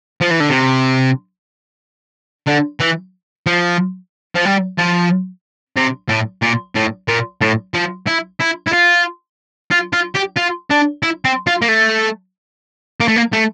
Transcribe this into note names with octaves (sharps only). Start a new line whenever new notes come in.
F3
E3
D3
C3
D3
E3
F3
F3
G3
F3
C3
A2
A#2
A2
A#2
A2
F3
E4
E4
E4
F4
F4
F4
G4
F4
D4
E4
C4
F4
A#3
A3
A#3
A3
A#3
A3